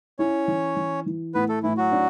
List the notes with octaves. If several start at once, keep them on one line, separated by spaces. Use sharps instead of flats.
C#4 E4 C#5
E3
E3
E3
A2 B3 B4
A3 A4
A2 E3 E4
F#3 F#4
D4